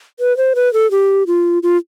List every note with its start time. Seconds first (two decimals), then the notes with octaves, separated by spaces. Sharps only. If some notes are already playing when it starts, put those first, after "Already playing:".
0.20 B4
0.37 C5
0.55 B4
0.74 A4
0.91 G4
1.27 F4
1.63 F4